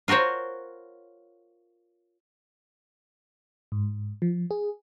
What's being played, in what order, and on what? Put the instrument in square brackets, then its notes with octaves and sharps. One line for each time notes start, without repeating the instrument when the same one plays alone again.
[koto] F4 F#4 A#4 C5 C#5
[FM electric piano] G#2
F3
G#4